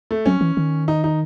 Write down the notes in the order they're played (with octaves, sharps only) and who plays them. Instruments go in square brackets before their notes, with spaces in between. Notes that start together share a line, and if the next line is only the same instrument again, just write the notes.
[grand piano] A3
[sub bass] F#3 [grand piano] C#4
[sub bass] E3
D#3
[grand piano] D#4
D#4